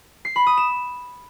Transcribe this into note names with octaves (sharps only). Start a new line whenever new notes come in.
C7
B5
D#6
E7